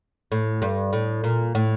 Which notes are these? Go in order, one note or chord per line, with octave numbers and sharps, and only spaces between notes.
A2
G2
A2
A#2
A2